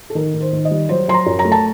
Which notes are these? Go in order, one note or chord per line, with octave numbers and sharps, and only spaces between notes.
A4
D#3 A#4
D#3
C5
D#3
D#5
G3
F#3 C5
F#3 C6
A#5
F#2
A#5
A3
A5